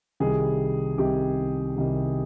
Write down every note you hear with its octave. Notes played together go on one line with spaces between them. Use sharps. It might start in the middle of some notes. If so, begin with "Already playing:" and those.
C2 C3 D#3 G3 G#4
C2 C3 D#3 G3 G4
C2 C3 D#3 G3